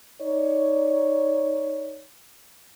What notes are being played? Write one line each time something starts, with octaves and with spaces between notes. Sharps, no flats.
D#4 C#5 D5